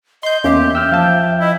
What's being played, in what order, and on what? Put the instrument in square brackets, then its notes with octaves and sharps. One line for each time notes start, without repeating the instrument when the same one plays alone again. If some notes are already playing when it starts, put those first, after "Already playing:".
[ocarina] D#5 [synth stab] C6 G6
[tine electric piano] E2 [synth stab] A#3 C#4 [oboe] G4 [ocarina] E5
[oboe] G5 [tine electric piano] E6 F6
[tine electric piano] F3 [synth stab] F5 A5
[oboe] E4 [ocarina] D#5